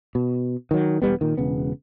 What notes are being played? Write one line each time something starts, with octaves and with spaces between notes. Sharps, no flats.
B2
D#3 F#3
E1 G3 B3
A#2 D#3
E1 C#3 B3